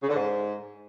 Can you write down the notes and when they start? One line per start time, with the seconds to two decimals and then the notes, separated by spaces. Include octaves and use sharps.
0.02 C#3
0.09 D3
0.15 G#2